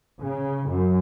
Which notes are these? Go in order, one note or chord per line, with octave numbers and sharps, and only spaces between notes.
C#3
F#2